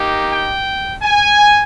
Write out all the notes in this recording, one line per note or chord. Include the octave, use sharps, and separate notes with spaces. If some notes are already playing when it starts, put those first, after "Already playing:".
Already playing: A#3 D#4 G4
G5
G#5